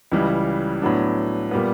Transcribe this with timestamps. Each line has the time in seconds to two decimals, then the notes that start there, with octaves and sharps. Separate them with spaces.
0.11 C#2 C#3 E3 G3
0.82 A2 F#3 B3 D4
1.51 A#2 G3 B3